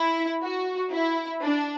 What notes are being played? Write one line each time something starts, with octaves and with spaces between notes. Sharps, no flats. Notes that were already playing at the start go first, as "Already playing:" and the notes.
Already playing: E4
F#4
E4
D4